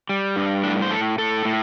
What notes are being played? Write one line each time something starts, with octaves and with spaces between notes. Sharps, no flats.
G3
G2
A2 D4
C5
A2 A4
A2 A4
A2